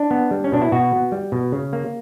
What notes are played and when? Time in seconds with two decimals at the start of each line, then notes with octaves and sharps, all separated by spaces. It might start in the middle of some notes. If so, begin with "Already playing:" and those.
Already playing: D4
0.11 B3
0.31 G3
0.44 C#4
0.52 B2 D4
0.62 E4
0.72 B2 F#4
0.92 B3
1.12 G3
1.32 B2
1.52 C#3
1.73 A#3